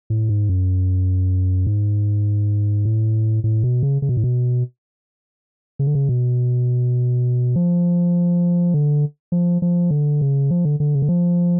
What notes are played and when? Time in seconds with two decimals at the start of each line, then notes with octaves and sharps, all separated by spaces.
0.10 A2
0.29 G#2
0.49 F#2
1.67 G#2
2.85 A2
3.44 A2
3.64 B2
3.83 C#3
4.02 C#3
4.09 B2
4.17 A2
4.24 B2
5.79 C#3
5.87 D3
5.95 C#3
6.09 B2
7.56 F3
8.74 D3
9.32 F3
9.62 F3
9.91 D3
10.21 C#3
10.51 F3
10.65 D3
10.80 D3
10.95 C#3
11.02 D3
11.09 F3